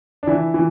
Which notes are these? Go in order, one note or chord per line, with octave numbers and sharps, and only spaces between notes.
D4
E3 E4
E3